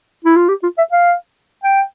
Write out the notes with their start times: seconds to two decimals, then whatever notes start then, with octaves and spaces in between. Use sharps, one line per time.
0.24 E4
0.36 F4
0.49 G4
0.63 F4
0.78 E5
0.92 F5
1.64 G5